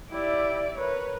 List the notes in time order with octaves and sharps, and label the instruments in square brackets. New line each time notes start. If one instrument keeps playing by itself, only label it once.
[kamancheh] E4 G4 [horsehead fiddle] D5 E5
[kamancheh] A#4 B4 [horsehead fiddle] C#5